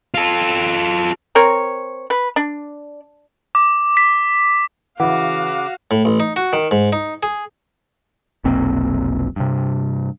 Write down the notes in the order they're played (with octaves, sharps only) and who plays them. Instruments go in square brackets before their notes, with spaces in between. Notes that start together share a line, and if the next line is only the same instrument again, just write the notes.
[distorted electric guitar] F4 A4
[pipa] C4 A#4 C#5
B4
D4
[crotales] D6
B6
[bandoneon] C#3 D6 [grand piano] E3 [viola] F#4 F5 [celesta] F#5
[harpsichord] A2
A1
D#4
F#4
D#3
G#2
D#4
G#4
[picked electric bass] F1 B1 A#3 C4
G2 C3